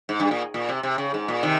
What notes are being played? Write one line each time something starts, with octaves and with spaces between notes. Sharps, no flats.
G#2
G2
A#2
A#2
C3
C3
C#3
G#2
A#2
C3 D#3